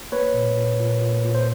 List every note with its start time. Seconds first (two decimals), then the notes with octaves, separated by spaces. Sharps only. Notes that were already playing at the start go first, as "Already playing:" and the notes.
0.12 A#3 B4 C#5
0.34 A#2
0.57 A#2
0.79 A#2
1.01 A#2
1.25 A#2
1.35 C5